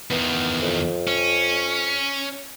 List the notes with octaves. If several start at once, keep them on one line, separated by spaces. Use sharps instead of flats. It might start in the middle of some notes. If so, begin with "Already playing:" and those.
E2 D#3 B3
F2
C#4